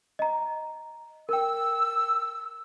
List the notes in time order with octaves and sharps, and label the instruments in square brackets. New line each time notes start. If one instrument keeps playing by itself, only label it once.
[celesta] D#5 A#5
[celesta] A#4 G5 [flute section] E6